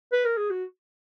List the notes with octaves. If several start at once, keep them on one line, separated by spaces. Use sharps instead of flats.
B4
A#4
G#4
F#4